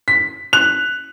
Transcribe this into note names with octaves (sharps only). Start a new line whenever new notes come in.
B6
F#6 F7